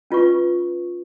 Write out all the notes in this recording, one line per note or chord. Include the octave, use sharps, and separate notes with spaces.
C#4 F4 B4 C#6